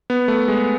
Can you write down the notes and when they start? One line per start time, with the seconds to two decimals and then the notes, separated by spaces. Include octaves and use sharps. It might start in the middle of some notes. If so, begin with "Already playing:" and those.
0.10 B3
0.28 A3
0.48 G#3